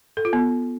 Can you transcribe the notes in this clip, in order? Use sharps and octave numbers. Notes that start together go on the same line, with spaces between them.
A4
F4
B3